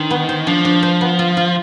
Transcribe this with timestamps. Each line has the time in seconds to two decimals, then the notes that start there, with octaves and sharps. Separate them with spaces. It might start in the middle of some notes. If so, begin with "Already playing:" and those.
Already playing: D#3 D4 C5
0.10 B3
0.29 C5
0.47 F3 D4
0.65 D4
0.83 C5
1.01 B3
1.19 F4
1.37 F4